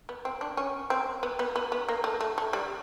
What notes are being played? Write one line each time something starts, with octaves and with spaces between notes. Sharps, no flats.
B3
C4
D4
C#4
C4
B3
B3
B3
B3
A#3
A3
A3
A3
G3